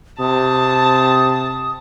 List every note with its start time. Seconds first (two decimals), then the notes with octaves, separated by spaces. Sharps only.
0.20 C3 A5 D#6